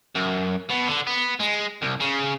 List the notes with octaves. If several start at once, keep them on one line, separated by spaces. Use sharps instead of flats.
F#2
B2
D3
B3
G#3
C2
C#3